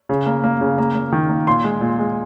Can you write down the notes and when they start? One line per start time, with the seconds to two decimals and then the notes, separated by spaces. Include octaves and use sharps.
0.09 C#3
0.26 A#3
0.44 A#3
0.61 C#3
0.78 A#3
0.95 A#3
1.12 D#3
1.29 A#3
1.47 A#2 C6
1.64 G#3
1.81 A#2
1.99 G#3